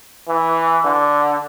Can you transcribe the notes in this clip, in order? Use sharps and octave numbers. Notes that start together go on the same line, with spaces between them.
E3
D3